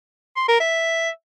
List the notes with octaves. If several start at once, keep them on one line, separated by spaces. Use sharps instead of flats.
C6
A#4
E5